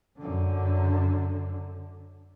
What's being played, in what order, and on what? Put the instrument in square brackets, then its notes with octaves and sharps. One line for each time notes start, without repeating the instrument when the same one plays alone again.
[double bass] F#2 D3